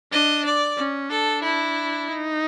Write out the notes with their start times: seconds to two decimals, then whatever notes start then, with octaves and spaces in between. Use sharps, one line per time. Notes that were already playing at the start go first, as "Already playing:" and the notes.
0.12 D4 D#5
0.45 D5
0.77 C#4
1.10 D4 A4
1.42 E4
2.08 D#4